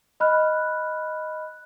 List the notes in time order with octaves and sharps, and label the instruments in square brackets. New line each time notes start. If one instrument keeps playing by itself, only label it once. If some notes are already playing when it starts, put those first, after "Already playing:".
[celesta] D#5 B5 F6 F#6